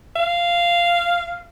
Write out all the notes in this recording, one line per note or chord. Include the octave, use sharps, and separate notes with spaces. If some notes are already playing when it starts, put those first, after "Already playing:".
F5